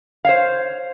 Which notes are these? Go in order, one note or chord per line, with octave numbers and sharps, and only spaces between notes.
C5 C#5 F5